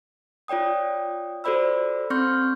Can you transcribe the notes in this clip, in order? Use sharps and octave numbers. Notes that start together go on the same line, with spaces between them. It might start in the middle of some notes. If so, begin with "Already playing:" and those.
F4 C#5 D5 G5 D#6
F#4 A4 C5 D5 B5 E6
C4 C6 C#6 F6 G6